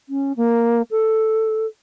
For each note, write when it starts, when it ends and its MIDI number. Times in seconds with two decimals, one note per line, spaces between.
0.09 0.33 61
0.37 0.82 58
0.91 1.66 69